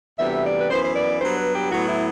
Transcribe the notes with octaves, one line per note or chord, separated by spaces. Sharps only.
D2 C3 E3 G3 B3 E5
D5
B4
F#2 E3 B3 C5
C5
D5
G2 F#3 B3 C5
B4
G4
A2 F#3 B3 F#4
E4